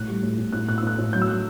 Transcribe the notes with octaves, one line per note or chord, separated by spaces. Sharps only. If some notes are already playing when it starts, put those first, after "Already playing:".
Already playing: A2 F#6
G3
A2
A2
A2 F#6
A2 F#6
E6
A2 F#6
A2
F#3 G6
E6
F#3 F#6